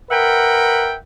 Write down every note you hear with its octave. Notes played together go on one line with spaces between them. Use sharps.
A#4 B4 E5 F#5 G5